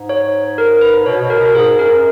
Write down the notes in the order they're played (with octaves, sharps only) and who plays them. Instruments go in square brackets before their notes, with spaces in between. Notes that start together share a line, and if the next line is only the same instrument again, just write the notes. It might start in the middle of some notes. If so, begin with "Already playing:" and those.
Already playing: [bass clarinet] G#2
[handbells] C#5
A#4
B4
[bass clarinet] B2 [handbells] C#5
[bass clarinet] B2
[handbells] A#4
[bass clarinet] B2
[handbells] A#4
[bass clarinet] G#2 [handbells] G#4
[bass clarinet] F#2 [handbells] A#4